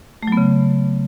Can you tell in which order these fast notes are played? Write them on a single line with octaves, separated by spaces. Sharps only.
A3 F#3 B3 C#3